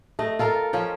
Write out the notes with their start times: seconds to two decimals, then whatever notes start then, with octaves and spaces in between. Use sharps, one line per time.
0.19 A3 D#5
0.39 F4 A4 A#4 F5
0.73 F3 C#4 G5